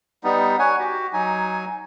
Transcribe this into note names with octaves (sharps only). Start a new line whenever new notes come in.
G3 B3 D#4
C#5 F#5 G#5
F#4 G4
F#3 D#4 G#5